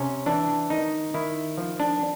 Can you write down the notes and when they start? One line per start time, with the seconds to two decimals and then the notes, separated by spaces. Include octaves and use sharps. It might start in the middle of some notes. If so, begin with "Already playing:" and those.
Already playing: C3 C#4
0.26 E3 D4
0.70 D#3 D#4
1.14 D#3 E4
1.58 F3
1.80 D4